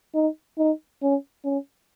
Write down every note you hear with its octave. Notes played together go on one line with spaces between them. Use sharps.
D#4
D#4
C#4
C#4